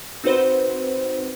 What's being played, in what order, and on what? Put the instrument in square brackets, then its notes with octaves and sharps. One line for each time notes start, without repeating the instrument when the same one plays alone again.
[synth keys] C4 D#4 F#4 B4 C5